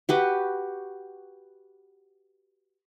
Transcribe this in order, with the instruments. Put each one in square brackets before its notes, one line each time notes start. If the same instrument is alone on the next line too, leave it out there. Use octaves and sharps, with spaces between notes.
[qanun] F#4 G4 B4